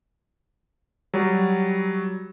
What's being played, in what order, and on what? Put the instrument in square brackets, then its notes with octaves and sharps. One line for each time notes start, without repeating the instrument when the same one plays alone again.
[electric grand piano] F#3 G3